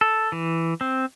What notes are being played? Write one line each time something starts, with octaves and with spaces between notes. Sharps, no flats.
A4
E3
C4